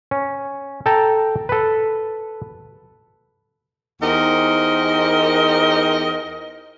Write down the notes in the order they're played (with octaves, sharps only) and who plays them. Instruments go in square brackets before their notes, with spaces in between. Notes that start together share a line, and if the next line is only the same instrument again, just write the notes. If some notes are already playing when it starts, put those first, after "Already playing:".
[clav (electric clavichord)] C#4
A4 G5 A5 A#5
A4 B4
[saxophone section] E2 D#4 G4 A#4 C5 D#5